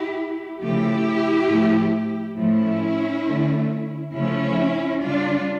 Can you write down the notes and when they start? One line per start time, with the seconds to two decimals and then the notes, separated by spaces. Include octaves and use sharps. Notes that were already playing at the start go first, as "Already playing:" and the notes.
Already playing: E4 G4
0.61 C#3 F3 A3 E4 G4
1.49 A2 F3 A3
2.38 A2 F3 A3 C#4 E4
3.26 D3 A3
4.14 C#3 F3 A3 C#4 E4
5.03 C#3 G3 D4 F4